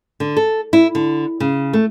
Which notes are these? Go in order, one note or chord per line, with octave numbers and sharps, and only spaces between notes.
D3
A4
E4
D3
C#3
A3